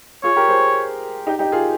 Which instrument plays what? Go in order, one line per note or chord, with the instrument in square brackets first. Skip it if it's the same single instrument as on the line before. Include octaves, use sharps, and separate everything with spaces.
[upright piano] F4 G#4 [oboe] C#5
[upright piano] G4 A#4
G#4 C5
D#4 G4
D#4 G4
F4 G#4